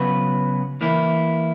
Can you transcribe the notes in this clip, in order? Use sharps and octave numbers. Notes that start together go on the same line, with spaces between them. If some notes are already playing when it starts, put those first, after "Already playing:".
Already playing: C#3 F#3 B3 F#4 B4
E3 A#3 E4